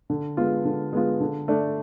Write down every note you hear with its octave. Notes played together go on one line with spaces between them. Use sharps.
D3
G#3 B3 F4
D3
G#3 B3 F4
D3
A3 D4